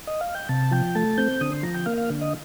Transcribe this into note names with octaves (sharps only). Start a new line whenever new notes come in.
D#5
F5
G5
C3 A5
F3 G5
A3 A5
C4 G6
D3 D#6
C6
F3 A#5
G5
A#3 F5
F5
D3
D#5